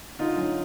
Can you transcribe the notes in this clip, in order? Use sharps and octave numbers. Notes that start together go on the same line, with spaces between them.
D3 D#4 F4
F#2